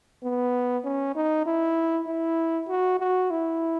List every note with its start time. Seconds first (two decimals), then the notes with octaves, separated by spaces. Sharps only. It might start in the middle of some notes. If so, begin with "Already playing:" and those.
0.23 B3
0.84 C#4
1.16 D#4
1.46 E4
2.08 E4
2.69 F#4
3.00 F#4
3.31 E4